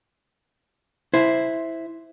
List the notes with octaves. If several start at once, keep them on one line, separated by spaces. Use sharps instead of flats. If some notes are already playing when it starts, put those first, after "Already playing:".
E4 C5